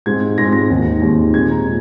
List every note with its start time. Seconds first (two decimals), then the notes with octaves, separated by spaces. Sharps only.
0.06 G#2 G#3 C4 G#6
0.38 G#2 G#3 C4 A#6
0.52 A#6
0.70 D#2 D#3 G#3 C4
1.02 D#2 D#3 G#3 C4
1.34 A#2 G#3 C4 G#6
1.50 A#5
1.66 A#2